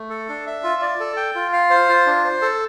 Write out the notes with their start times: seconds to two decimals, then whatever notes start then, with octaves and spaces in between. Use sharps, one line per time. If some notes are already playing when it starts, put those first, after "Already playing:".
Already playing: A3
0.10 A4
0.29 D4
0.47 E5
0.63 F4
0.82 D5
1.00 A4
1.17 G5
1.35 F4
1.53 F5
1.70 C5
1.89 F4
2.06 D4
2.24 C5
2.42 A4